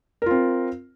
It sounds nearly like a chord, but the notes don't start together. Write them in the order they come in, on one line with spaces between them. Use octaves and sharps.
A#4 F4 C4